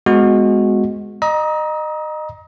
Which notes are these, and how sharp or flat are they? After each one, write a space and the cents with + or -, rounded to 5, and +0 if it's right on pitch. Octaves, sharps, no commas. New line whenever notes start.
G#3 +0 B3 +25 F#4 -15
D#5 -25 A#5 +25 D#6 +40